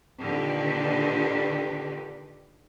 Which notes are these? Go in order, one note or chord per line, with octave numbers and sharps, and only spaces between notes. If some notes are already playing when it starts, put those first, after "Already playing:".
A#2 D3 D#3 G4 B4